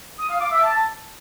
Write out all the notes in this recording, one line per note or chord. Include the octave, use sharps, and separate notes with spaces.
D#6
F5
D6
E5
A5